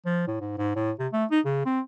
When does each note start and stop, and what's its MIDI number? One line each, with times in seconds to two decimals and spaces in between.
0.05 0.25 53
0.27 0.37 45
0.41 0.54 44
0.58 0.73 44
0.75 0.92 45
0.99 1.08 48
1.13 1.25 57
1.31 1.40 63
1.45 1.64 49
1.65 1.80 60